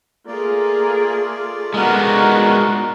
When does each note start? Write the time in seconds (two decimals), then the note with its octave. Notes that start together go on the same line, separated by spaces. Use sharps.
0.27 A3 A#3 F4 G#4 D5
1.74 G#3 B3 D#4 F#4 A#4